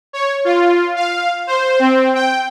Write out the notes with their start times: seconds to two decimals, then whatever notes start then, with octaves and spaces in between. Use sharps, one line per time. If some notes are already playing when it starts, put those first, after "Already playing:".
0.13 C#5
0.45 F4
0.96 F5
1.47 C5
1.79 C4
2.14 G5